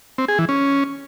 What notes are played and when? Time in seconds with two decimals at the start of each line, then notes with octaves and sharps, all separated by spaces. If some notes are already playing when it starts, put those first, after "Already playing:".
0.18 C4
0.28 G#4
0.39 E3
0.49 C#4